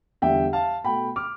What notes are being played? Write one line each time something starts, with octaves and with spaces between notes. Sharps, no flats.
E2 D3 G3 E5 G5
F5 A5
B2 A3 G5 B5
D6 F6